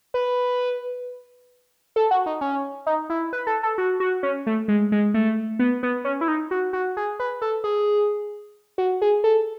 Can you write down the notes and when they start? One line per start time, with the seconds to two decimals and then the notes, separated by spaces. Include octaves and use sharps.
0.14 B4
1.96 A4
2.11 F#4
2.26 D#4
2.41 C#4
2.86 D#4
3.10 E4
3.33 B4
3.47 A4
3.63 A4
3.78 F#4
4.00 F#4
4.23 C#4
4.47 A3
4.68 G#3
4.92 G#3
5.14 A3
5.59 B3
5.83 B3
6.05 C#4
6.21 E4
6.28 D#4
6.51 F#4
6.73 F#4
6.97 G#4
7.20 B4
7.42 A4
7.64 G#4
8.78 F#4
9.02 G#4
9.24 A4